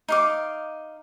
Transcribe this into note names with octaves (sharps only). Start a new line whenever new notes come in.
D#4 F5 D6